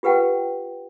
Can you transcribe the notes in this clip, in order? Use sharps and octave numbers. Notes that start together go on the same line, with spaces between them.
F4 G4 B4 F#5 G5